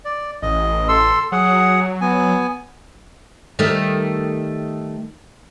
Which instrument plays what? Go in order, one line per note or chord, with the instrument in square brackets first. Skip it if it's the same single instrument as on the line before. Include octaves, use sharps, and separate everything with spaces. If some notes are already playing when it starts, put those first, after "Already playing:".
[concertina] D5
[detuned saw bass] A1 [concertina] D#5
[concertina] A4 C6 E6
[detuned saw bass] F#3 [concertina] G#4 F#5
[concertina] B3 G#5
[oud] D#3 G3 A3